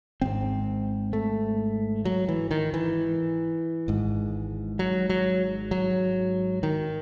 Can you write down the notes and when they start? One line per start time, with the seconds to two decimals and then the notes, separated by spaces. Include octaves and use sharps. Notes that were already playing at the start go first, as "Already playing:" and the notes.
0.21 G#1 G#2 C4
1.13 A3
2.05 F#3
2.28 E3
2.51 D#3
2.74 E3
3.88 G#1 G#2
4.79 F#3
5.10 F#3
5.71 F#3
6.63 D#3